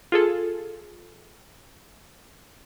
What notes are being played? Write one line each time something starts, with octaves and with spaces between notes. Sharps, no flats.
F4 G#4 A4